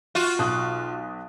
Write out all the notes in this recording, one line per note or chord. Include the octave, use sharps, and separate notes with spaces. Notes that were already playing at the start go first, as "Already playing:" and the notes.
F4 F#4
B1 D#6 F#6